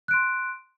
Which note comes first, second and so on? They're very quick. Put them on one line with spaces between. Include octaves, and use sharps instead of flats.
F#6 D7 C6